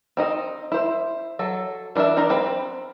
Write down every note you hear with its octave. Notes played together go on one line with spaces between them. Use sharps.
C4 D#4 D#5
E4 C5
F#3 A4
E3 D4 E4 A#4 E5
E3 D4 D#4 A#4 A#5
C4 B4